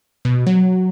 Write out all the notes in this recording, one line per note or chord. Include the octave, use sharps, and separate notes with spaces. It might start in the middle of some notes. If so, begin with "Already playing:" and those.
B2
F#3